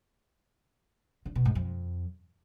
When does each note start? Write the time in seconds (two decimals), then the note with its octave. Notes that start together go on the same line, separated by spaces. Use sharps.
1.25 D3
1.35 B2
1.45 G#2
1.55 F2